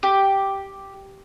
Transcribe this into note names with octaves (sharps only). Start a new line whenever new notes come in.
G4